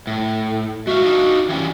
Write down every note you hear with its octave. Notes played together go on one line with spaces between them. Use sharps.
A2
G#3 F#4 E5 F5
D4 D#4 F4
E3 G3 C#4